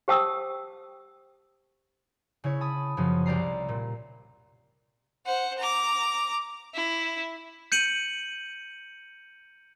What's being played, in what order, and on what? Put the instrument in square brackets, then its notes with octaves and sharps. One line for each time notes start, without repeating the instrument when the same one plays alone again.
[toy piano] G4 C5 G5 A5 D#6 E6
[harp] C#3 E4 C#5
A5 B5 D#6
F#2 C#3 F3
C2 G4 D5 A#5 C7
A#2
[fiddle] C5 F#5
A#5 D6
E4
[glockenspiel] G6 C#7 D#7 F#7